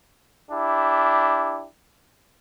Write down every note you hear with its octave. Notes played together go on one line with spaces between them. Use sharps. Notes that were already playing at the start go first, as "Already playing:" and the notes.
D4 E4 G4